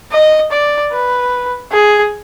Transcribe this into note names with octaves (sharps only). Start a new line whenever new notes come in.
D#5
D5
B4
G#4